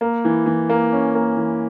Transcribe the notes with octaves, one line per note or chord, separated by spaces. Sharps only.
A#3
E3
E3
A#3
C#4
A#3
E3